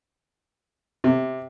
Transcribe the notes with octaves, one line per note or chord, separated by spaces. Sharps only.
C3